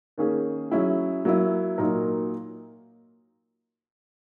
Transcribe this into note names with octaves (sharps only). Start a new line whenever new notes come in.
D#3 A#3 C#4 G#4
F#3 C#4 E4 G#4
F#3 A#3 E4
A#2 F#3 A#3 D#4 A#4